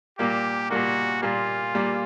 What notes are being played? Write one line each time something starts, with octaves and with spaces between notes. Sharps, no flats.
A#2 G3 A#3 G4
A#2 G3 A#3 F#4
A#2 G3 A#3 F4
A#2 G3 A#3